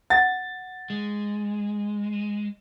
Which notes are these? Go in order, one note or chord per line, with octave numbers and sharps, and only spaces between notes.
F#5 A6
G#3